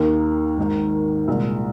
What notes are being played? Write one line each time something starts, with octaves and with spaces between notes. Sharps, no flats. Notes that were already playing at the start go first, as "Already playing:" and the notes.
Already playing: D#2 D#3 A#3 D#4
G#1 G#2 D#3
C2 A#2 G#3